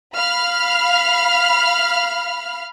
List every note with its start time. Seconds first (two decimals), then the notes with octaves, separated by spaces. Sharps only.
0.15 F5 B5 F6